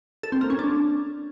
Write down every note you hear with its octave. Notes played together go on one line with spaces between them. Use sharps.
A4
C4
A#3
C#4
D4